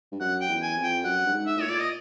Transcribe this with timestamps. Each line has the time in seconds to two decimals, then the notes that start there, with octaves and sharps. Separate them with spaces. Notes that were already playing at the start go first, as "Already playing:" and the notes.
0.12 G2
0.20 F#2 F#5
0.41 G5
0.49 E2
0.62 G#5
0.76 F2
0.83 G5
1.04 F#2 F#5
1.26 G2
1.32 G#2
1.46 E5
1.57 A2
1.60 A#2 C#5
1.70 D5
1.79 D#5